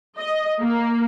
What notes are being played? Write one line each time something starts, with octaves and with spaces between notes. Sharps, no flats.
D#5
A#3